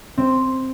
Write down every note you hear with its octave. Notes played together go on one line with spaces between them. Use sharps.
C4